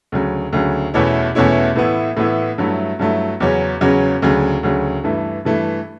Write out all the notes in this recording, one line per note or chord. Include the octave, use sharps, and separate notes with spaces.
D2 C#3 F#3
D2 C#3 F#3
E2 B2 A3 C#4 E4
E2 B2 A3 C#4 E4
A2 E3 B3 E4
A2 E3 B3 E4
G2 F#3 A3 E4
G2 F#3 A3 E4
E2 C#3 F#3 C#4
E2 C#3 F#3 C#4
D2 C#3 F#3
D2 C#3 F#3
G2 E3 A3
G2 E3 A3